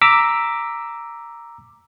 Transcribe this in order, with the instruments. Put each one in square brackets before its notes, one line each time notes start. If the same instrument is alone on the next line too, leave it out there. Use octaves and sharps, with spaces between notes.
[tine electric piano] A#5 D6 E6 B6